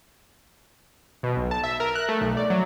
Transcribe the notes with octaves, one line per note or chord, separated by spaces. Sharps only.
B2
B1
A5
E5
A#4
F#6
A3
B1
D5
F#3